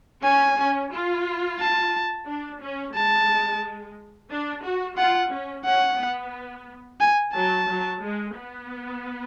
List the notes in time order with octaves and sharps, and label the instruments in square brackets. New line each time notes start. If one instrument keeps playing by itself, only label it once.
[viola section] C#4 [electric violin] G#5
[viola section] C#4
F4
[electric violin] A5
[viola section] D4
C#4
[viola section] G#3 [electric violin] A5
[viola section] D4
F#4
[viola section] F4 [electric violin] F#5
[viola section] C#4
[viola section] C#4 [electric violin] F#5
[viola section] B3
[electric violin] G#5
[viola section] F#3 [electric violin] A5
[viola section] F#3
G#3
B3